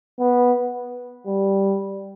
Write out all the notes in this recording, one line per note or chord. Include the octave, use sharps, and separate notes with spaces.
B3
G3